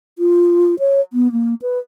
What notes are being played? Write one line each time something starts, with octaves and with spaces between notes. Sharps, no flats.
F4
C#5
B3
A#3
B4